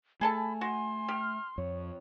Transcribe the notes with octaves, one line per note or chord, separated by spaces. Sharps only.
A3 G#4 A4 G#5 A5 B5
F#4 C6
G4 F6
F2 C#5